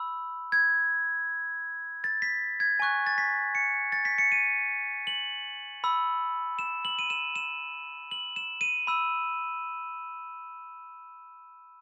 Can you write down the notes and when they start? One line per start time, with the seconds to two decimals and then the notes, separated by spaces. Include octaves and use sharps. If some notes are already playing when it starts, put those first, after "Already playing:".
Already playing: B5 E6
0.52 G#6
2.04 A6
2.22 B6
2.60 G#6
2.80 G#5 C#6 F#6
3.07 A6
3.18 B6
3.55 C#7
3.92 A6
4.05 B6
4.18 C#7
4.32 D#7
5.07 F#7
5.84 B5 E6
6.59 E7
6.85 F#7
6.99 D#7
7.10 E7
7.36 E7
8.11 F#7
8.36 E7
8.61 D#7
8.87 B5 E6